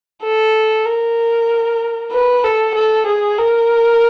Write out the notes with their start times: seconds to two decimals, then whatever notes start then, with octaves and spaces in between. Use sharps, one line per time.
0.23 A4
0.85 A#4
2.12 B4
2.44 A4
2.75 A4
3.06 G#4
3.38 A#4